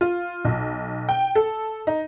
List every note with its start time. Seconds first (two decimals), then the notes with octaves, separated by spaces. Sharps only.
0.01 F4
0.45 B1
1.09 G5
1.35 A4
1.87 D#4